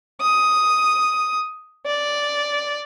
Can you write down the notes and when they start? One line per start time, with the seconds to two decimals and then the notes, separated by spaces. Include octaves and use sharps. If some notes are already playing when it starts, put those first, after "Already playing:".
0.21 D#6
1.86 D5